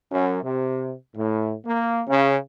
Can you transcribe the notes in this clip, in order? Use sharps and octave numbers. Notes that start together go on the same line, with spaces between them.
F#2
C3
A2
A#3
C#3